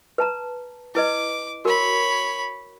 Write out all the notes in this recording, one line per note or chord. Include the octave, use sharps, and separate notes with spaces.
B4 A5 A#5
E4 B4 D#5 D6
F#4 A#4 C#5 B5